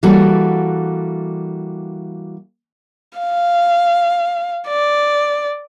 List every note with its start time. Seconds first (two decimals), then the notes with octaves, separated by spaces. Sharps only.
0.03 E3 G3 A#3 F#4 A4
3.19 F5
4.68 D5